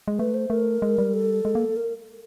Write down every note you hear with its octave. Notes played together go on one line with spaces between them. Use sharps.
G#3
A3 B4
C5
A3 A#4
G#3
G3
A4
G#3
A#3
A#4